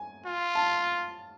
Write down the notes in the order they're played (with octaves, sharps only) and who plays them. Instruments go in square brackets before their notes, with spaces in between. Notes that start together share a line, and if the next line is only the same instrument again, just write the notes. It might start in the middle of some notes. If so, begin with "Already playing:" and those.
Already playing: [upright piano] G#5
[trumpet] F4
[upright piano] A5